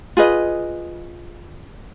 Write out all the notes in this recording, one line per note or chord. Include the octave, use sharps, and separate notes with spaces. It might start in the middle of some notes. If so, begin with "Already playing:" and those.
F4 G#4 B4 D#5